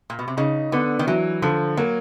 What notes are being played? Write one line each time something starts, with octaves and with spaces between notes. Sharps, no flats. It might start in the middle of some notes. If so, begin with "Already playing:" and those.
A#2
B2
C3
C#3 D#4
D3 B3
D#3
E3 F#3
D3 F3
F#3 A#3